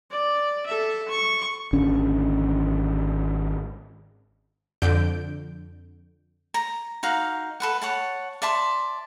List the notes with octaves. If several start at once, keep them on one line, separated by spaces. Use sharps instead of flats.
D5
A4 E5
C#6
G#1 D3 C#4
F2 D3 G6 D7
A#5
D#4 F#4 F5
A4 B4 F#5
C#5 F#5 A5
D5 E5 A5 C6